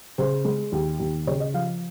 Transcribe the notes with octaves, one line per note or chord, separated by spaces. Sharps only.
C#3 C5
G#3
D#2
D#2
C#3 C#5
D#5
F3 F5